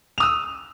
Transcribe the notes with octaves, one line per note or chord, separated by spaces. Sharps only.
D#6 E6 F7